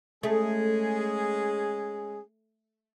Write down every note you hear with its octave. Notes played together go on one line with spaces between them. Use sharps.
G#3 A3 C#4 G#4